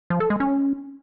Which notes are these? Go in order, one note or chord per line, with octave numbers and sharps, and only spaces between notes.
F3
A4
G#3
C#4